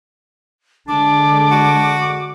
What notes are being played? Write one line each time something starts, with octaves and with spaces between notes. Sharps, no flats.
D3 G#3 D4 D6
F#4